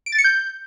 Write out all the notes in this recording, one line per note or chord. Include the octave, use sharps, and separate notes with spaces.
D7
A6
C#7
G6